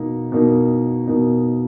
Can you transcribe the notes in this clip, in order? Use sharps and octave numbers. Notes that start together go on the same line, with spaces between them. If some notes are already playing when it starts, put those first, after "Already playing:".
Already playing: B2 A#3 D#4
B2 A#3 D#4
B2 A#3 D#4